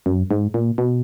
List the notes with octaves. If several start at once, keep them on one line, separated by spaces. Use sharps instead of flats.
F#2
G#2
A#2
B2